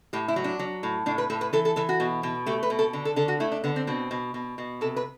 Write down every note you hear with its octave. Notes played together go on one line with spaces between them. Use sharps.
A2 G4
E4
F#3
D4
F#3
A2
A2 D4
B4
A2 A4
B4
E3 A4
A4
E3 A4
F#4
B2
B2
A3 G4
B4
B2
A4
D3
A4
D3 A4
F#4
A3 E4
D4
D3 B3
C4
B2 C4
B2
B2
B2
C3 A4
B4